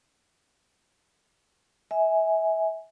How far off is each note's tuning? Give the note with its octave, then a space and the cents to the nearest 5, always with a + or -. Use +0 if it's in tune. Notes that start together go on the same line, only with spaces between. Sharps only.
E5 -30 G#5 +0